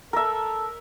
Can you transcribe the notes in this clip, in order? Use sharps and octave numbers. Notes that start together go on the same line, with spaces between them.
A4 A#4 E5